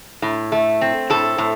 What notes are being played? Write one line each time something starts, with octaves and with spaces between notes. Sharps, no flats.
A2
A3
C4
A2 A4
A2